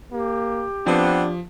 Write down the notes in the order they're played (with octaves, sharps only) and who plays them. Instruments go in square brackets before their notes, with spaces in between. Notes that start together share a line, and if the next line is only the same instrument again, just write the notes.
[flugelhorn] A#3 [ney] G4
[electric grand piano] F3 [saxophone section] B3 C4 [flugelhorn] D4